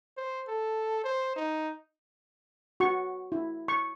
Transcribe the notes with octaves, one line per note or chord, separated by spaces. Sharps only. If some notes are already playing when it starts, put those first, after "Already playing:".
C5
A4
C5
D#4
F#4 C#6
E4
C#6